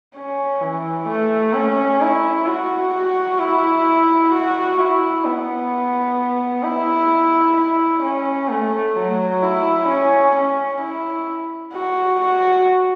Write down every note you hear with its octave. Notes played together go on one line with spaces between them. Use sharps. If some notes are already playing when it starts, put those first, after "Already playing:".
C#4
E3
A3
C#4
E4
F#4
F#4
E4
F#4
E4
B3
E4
E4
C#4
A3
F#3
E4
C#4
C#4
E4
F#4
F#4